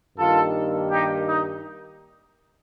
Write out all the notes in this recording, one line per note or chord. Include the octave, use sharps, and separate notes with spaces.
G2 D#3 A#3 D#4 F4 A4
D#4 G4
D#4